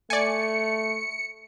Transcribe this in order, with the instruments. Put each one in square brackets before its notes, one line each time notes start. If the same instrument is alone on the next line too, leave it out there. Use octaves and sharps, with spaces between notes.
[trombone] A3 [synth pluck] D5 G#5 [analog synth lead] C#7